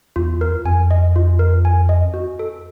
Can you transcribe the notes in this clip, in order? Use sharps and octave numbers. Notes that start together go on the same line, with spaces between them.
E2 F4
A#4
F2 G#5
D#5
F4
A#4
G#5
D#5
F#4
A4